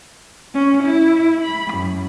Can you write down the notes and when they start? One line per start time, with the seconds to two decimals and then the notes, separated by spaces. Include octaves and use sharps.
0.54 C#4
0.84 E4
1.41 B5
1.73 F#2